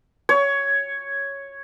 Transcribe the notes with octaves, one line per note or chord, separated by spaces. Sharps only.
C#5